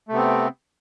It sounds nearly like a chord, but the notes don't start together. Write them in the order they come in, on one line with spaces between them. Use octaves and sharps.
A3 C3 B3 C4